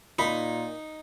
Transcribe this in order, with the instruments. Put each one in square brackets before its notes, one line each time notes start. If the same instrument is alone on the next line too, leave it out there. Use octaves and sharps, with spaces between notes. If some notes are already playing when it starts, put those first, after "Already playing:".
[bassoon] A#2 [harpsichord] D#4 [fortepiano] B5